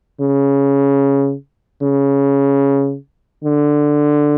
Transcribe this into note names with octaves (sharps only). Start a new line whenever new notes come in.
C#3
C#3
D3